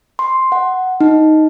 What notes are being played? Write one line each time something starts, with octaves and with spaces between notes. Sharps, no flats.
C6
F#5
D#4